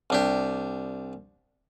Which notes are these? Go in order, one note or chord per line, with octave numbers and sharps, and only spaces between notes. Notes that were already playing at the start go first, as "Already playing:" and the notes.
C2 D4 G4